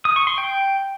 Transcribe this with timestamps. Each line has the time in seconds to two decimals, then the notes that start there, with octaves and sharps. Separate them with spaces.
0.05 D#6
0.16 C#6
0.27 C6
0.38 G5